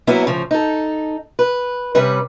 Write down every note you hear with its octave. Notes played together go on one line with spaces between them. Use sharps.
F#3 A#3 B3 C#4 E4
A2 C#3 F3
D#4 A4
B4
C3 G3 C#4 B4